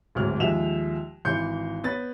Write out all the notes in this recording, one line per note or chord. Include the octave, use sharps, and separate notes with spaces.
D1 D2 G#2 F#3 C#5 F6
D#2 F3 G#3 E5 E7 F7
G#1 E3 E4 C6 G6 C#7
B3 B4 C#5 A6